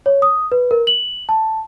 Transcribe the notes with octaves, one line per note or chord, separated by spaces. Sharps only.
C#5
D#6
B4
A#4
F#7
A5